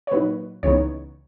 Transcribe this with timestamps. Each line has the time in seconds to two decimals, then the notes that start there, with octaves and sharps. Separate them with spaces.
0.07 C#5
0.11 A#2 F#3 A#3 D#4 B4
0.63 C#2 C#3 E3 B3 D#4 C#5